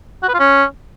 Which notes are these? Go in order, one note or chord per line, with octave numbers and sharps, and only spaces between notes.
F#4
B4
F4
C#4